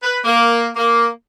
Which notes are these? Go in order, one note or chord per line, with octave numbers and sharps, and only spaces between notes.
B4
A#3
A#3